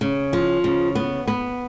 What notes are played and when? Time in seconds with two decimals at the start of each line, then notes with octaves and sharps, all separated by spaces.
0.01 C#3
0.33 F3
0.64 C#3
0.95 B3
1.28 B3